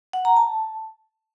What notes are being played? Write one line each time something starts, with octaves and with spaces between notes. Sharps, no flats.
F#5
A#5
A5